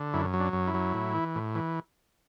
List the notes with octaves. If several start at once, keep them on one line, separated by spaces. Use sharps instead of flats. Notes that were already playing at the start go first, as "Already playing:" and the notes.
Already playing: D3
F#2 E4
F#3
D4
F#2
E4
F#3
A2
E3
A2
E3